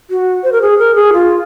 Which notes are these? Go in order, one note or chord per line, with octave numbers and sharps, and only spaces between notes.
F#4
C5
A#4
G#4
A#4
G#4
F4